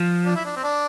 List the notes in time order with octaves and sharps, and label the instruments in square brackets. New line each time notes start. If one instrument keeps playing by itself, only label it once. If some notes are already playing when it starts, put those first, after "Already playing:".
Already playing: [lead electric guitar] F3
[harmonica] D4
E4
D4
C4
D4